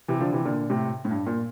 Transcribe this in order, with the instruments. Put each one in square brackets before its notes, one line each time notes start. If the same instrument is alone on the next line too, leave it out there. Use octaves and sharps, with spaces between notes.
[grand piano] C3 E3
D3 F3
C3 E3
A#2 D3
A2 C3
A2
G2
A#2